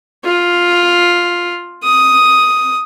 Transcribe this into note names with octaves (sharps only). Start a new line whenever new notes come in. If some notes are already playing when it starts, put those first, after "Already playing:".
F4
D#6